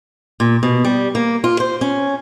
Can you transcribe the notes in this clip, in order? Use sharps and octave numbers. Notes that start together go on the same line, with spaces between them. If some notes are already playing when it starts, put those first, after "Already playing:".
A#2
B2
G3
A#3
F4
C5
C#4